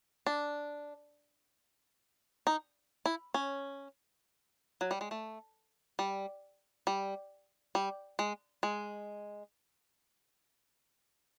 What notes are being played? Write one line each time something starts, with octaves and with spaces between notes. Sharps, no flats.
D4
D#4
E4
C#4
F#3
G3
G#3
A3
G3
G3
G3
G#3
G#3